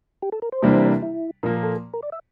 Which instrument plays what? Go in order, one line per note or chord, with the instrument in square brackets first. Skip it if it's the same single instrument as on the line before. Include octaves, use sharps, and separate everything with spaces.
[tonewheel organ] G4
A4
A#4
C5
[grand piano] C3 E3 G3 A#3 D4
[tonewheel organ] E4
[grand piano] A#2 F3 A#3 [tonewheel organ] A#4
[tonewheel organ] A4
A#4
D5
E5